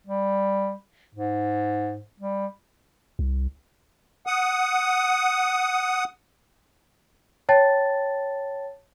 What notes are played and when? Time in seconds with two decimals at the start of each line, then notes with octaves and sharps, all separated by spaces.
0.07 G3
1.15 G#2
2.20 G3
3.19 C2
4.27 F#5 D#6
7.49 C#5 G5 A5 A6